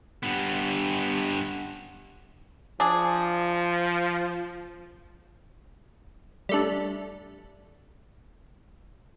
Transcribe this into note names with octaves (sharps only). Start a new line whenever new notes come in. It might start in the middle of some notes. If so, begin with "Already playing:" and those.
G2 B3
F3 D4 G#4
G3 A3 D4